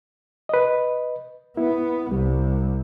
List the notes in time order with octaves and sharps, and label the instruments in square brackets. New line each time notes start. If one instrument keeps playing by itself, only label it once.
[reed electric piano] B4 D#5
[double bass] B3 [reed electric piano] E4
[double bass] C2 [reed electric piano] G3